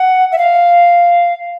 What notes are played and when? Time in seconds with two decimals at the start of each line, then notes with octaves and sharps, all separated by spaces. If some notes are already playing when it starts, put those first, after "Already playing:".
Already playing: F#5
0.32 E5
0.38 F5